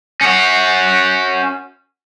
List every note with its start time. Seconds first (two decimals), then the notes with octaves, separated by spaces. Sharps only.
0.21 C#4 F#4